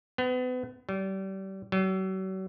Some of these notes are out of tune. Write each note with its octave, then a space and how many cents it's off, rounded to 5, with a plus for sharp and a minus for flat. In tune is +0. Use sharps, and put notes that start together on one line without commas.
B3 +35
G3 -30
F#3 +40